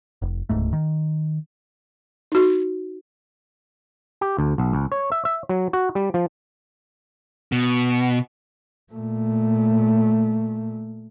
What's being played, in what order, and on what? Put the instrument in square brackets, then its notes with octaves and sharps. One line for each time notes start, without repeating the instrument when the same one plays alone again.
[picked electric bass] F1
D1 C#2 G#2 A3
D#3
[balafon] D#4 F#4
[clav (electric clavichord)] G4
D2
B1
C#2
C#5
E5
E5
F#3
F#4
G3
F3
[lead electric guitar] B2
[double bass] A#2 A3